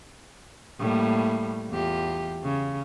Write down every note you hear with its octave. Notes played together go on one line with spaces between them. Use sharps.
A2 G3 A#3
E2 F4 G4
C#3